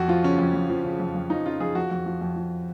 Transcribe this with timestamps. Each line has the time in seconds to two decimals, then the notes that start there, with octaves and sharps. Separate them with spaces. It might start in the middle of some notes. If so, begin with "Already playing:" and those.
Already playing: F2 F#4
0.08 F3 F4
0.23 C#3 C#4
0.39 F2
0.54 F2
0.70 F3
0.85 C#3
1.00 F2
1.15 F2
1.30 F3 D#4
1.45 C#3 F4
1.60 F2 G#4
1.75 F3 F#4
1.91 F2
2.06 F3
2.21 F2
2.36 F3